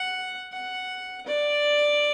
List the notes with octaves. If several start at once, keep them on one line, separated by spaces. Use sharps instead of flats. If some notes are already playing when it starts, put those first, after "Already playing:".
Already playing: F#5
F#5
D5